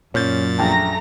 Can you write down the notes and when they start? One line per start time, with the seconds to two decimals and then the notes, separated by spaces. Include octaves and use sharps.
0.14 F#2 A#2 C#4 G6 A6
0.58 A#1 A3 G5 A5 A#5 A#6